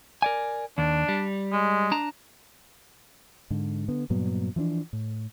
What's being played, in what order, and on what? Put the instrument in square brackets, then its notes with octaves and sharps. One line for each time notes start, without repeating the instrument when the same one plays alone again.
[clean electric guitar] A#4 D5 G#5
[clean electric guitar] D#2 [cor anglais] D4
[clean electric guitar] G3
[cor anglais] G#3
[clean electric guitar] D4 A5 A#5
[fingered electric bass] G#2 D3
D3 B3
G2 A#2 F#3 B3
E3 F3 C4 D4
A2